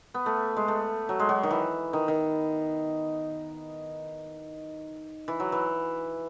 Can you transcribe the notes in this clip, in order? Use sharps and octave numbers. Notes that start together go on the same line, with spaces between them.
B3
A3
G#3
A3
F#3
G#3
F#3
D#3
E3
D#3
D#3
E3
F#3
E3